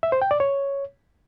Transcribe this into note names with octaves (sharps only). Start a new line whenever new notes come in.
E5
C5
G5
D5
C#5